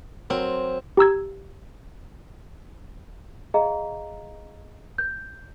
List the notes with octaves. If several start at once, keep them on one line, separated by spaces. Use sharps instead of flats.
F#3 C4 A#4
G4 A#5 E6 G#6
G#4 D#5 F5 A#5
G6